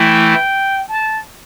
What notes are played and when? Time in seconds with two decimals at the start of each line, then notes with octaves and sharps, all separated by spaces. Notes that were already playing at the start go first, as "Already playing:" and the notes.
Already playing: E3 A3 E4 G5
0.88 A5